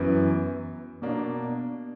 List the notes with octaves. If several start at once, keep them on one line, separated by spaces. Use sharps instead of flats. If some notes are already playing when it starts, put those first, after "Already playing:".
Already playing: F#2 E3 B3
B2 A#3 D4